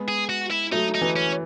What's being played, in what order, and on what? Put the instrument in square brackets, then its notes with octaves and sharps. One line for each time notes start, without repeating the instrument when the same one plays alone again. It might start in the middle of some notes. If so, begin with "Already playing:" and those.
Already playing: [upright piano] G#3 B3
[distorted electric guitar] G#4
F#4
E4
[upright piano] F#3 A3 [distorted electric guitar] D#4
[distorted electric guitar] D#4
[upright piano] E3
[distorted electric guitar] C#4